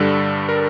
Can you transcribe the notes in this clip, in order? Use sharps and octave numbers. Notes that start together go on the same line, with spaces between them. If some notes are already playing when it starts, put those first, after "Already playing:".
Already playing: G2 D3 G3 A4
A#4